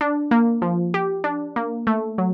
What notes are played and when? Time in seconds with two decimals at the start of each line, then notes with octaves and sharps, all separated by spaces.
0.01 D4
0.31 A#3
0.62 F3
0.94 G4
1.24 D4
1.56 A#3
1.87 A3
2.18 F#3